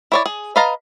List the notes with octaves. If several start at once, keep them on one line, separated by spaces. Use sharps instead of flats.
E4 C#5 D5
G#4
B4 D#5 F5 A5 A#5